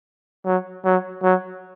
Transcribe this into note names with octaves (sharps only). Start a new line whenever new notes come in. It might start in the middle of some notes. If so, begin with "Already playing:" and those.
F#3
F#3
F#3